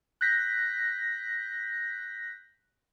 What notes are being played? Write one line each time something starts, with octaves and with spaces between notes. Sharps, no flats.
F#6 G6 A#6 B6